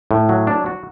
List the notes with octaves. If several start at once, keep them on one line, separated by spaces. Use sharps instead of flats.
A2
F#3
D4
F#4